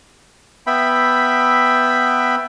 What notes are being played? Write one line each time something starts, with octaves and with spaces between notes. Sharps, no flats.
B3 E5 G5 B5